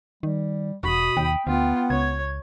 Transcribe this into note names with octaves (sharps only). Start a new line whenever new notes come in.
D#3 G3
E1 B2 F#4 B5 D#6
D#2 G5
D2 B3 F4
C#2 C#5 G#6